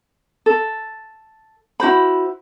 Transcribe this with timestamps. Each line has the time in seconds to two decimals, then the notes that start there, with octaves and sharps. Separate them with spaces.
0.46 A4
1.80 E4 F#4 C5 B5